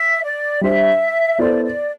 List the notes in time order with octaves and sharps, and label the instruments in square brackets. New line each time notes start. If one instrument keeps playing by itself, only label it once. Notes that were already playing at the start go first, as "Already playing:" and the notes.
Already playing: [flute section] E5
D5
[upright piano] G3 D4 G4 C5 [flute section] E5
[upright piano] B3 E4 A4 C5 [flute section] D5
[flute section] D5